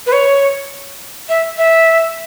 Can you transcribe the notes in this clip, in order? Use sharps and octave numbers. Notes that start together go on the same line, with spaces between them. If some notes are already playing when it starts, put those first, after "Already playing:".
B4
C#5
E5
E5